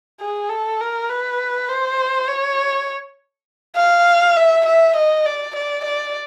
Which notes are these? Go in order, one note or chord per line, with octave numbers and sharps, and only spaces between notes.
G#4
A4
A#4
B4
C5
C#5
F5
E5
E5
D#5
D5
D5
D5